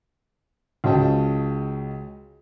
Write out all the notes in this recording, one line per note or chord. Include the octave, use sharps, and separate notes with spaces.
C#2 C#3 F#4 D#5 G5 A5